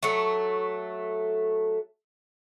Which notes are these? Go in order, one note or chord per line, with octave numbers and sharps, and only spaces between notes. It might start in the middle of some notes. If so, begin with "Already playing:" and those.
F#3 A3